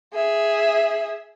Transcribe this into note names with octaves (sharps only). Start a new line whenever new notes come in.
G#4 E5